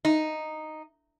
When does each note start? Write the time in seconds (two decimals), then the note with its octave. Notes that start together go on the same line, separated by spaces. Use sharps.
0.05 D#4